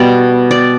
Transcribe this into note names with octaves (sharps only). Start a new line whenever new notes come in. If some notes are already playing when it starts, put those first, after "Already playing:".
Already playing: B2 G3 B3 D5
D5